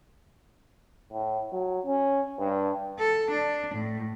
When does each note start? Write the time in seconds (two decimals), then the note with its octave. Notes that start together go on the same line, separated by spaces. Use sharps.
1.12 A2
1.53 F#3
1.86 C#4
2.39 G2
2.99 A4
3.31 D4
3.75 A2